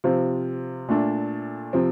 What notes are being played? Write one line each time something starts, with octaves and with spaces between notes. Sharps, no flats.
C3 F3 C4 F4
A#2 A3 D4
C3 F3 C4